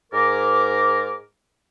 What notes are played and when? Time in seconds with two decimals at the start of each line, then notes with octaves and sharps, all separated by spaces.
0.12 G#2 A#4 D6